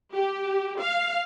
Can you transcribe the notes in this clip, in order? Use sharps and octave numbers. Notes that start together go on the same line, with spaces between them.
G4
F5